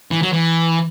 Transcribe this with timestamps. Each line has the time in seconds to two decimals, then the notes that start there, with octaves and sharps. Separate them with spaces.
0.11 E3
0.22 F#3
0.33 E3